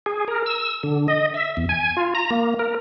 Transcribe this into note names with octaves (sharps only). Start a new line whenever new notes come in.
G#4
A#4
E6
D3
D#5
E5
E2
G#5
F4
A#5
A#3
A#4